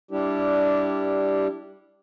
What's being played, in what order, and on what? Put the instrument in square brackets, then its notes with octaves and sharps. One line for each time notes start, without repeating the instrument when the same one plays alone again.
[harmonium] G3 D4 E4 G4